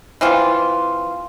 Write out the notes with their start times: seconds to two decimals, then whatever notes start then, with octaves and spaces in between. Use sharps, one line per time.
0.21 E3 C4 F4